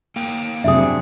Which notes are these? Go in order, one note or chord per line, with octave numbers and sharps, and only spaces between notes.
A#3 G5
F2 C3 F#3 D4 G#4 E5 D#6